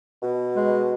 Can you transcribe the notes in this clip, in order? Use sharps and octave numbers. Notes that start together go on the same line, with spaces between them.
B2
G#3